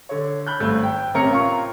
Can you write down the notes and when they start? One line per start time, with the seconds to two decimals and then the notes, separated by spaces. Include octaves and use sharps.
0.09 D3 C#5
0.47 B5 F#6 G6
0.60 G#1 G2 A3 G6
0.83 G5
1.14 A1 C3 A#4 C#5 C#7
1.32 F4 A#5 C#6